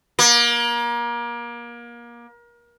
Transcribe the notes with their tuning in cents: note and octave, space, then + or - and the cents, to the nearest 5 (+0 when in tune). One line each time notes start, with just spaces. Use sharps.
A#3 +30